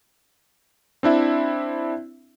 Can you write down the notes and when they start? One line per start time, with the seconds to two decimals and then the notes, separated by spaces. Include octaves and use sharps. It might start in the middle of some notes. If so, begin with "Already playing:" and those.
1.03 C4 D4 E4 E5